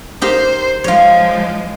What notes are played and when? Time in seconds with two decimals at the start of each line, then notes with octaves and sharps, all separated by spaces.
0.22 D#4 G4 A#4 C5
0.84 F3 G#3 F4 C#5